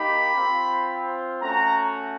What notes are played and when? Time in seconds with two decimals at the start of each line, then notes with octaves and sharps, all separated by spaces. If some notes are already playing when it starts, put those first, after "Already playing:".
Already playing: A#3 D#4 G4 B5
0.35 C4 F4
1.41 A3 C#4 F#4 A#5